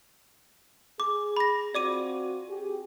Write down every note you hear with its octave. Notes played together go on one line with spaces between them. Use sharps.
G#4 D6
B5 A#6
C4 F4 F#4 D5 D6 D#7
G4 G#4